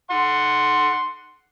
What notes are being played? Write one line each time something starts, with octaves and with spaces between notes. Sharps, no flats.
F#5 C6